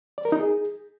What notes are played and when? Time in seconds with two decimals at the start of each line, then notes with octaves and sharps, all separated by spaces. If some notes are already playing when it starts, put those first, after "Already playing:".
0.18 D5
0.25 A#4
0.32 D#4
0.40 G#4